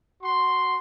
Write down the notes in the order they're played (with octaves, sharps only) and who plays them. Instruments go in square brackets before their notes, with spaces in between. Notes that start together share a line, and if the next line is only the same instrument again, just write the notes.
[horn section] F#4 C6